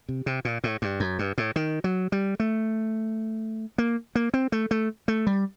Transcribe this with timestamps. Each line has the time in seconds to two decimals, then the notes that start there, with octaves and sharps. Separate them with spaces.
0.09 C3
0.26 C3
0.45 A#2
0.64 A2
0.82 G2
1.00 F#2
1.19 G2
1.38 A2
1.56 D#3
1.84 F#3
2.12 G3
2.40 A3
3.78 A#3
4.15 A#3
4.34 C4
4.52 A3
4.71 A3
5.08 A3
5.27 G3